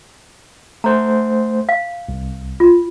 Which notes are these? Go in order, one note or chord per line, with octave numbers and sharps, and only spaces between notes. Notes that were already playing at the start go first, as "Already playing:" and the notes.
A3 C5 A#5
F5
C2
F4